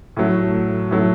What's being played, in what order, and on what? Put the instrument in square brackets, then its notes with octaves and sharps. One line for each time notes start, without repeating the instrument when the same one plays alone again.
[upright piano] A2 F#3 A3
A2 F#3 A3